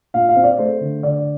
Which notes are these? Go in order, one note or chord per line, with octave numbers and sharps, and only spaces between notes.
A#2 F5
F5
C4
D5
A3 C5
D3
D3 D5